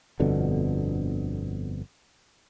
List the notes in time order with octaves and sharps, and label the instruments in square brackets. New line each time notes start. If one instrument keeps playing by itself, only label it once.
[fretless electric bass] G1 F2 B2 D3